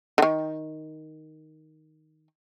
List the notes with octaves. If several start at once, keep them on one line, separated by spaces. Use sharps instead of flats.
D3 D#3